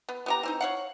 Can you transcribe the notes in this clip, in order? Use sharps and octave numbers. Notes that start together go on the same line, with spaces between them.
B3
B3 G4 A#5
E3 C4 D#4
C#5 F5 F#5